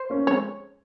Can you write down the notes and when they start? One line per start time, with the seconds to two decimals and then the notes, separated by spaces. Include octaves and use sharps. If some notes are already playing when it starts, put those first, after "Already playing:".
Already playing: C5
0.10 A#3 C#4
0.27 G#3 C4 C#5